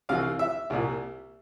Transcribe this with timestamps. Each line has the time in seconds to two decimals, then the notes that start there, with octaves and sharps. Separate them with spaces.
0.09 C2 C3 E3 F5
0.39 E5
0.70 C2 A#2